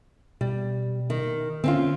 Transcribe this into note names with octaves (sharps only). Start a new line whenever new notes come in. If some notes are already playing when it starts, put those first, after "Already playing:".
B2 G3
D#3
D3 C4 C#4 F4